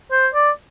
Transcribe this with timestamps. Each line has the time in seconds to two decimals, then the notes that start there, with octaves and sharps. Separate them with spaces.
0.11 C5
0.34 D5